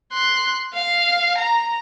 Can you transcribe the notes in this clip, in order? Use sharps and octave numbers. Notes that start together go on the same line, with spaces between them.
C6 F#6
F5
A#5